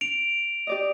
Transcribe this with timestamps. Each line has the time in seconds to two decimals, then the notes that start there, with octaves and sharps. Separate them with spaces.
0.01 D7 F7
0.67 G4 D5 D#5